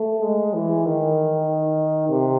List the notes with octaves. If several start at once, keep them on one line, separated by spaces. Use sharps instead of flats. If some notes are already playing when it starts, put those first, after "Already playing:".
Already playing: A3
G#3
E3
D#3
C3